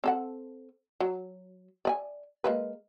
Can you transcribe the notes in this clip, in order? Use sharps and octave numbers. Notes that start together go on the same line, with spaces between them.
C4 A4 F#5
F#3
D5 D#5 G#5
G#3 A#3 B4